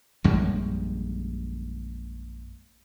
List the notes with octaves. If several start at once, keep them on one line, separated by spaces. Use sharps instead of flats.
A#1 F#2 G3 G#3